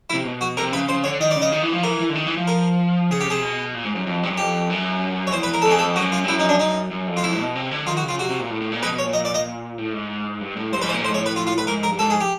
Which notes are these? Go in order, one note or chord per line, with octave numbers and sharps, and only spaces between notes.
E4
C3
B2
F#4
C3 A#4
C#3 B4
C#3 C5
D3 C#5
D#3 D#5
C#3 D5
D#5
D#3
E3
F3
E3 A#4
E3
D3
D#3
E3
F3
A#4
C#3 G#4
G4
C3 G#4
B2
A#2
G#2
F#2
F2
G2
F#2
F2 G4
F#2
C#5
E2 C5
B4
A#4
A4
F2
G#4
A4
F#2 F#4
F4
G2
F#2 E4
D#4
D4
F#2 D#4
F#2
F2
F4
F2 E4
B2
C3
D3
D#3 F4
F#4
C#3
F4
C3 F#4
C3
A#2
A2
A2
A#2
B2 B4
B2
C#5
A#2
D#5
D5
D#5
A2
G#2
G2
A2
G2 C5
G#2 B4
C5
A#2
A2 C5
G#2
C#5
A2
B4
F4
F4
B4
G#2 A#4
A#4
G2
G#2 A4
G#4
G4